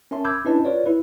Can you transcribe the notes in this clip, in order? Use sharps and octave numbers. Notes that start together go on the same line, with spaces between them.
C#4 A#4 E5 A5 C6
B5 D6 E6 G6 G#6
C#4 D4 E4 B4 D#5 A5
F4 B4 C#5 D5
E4 B4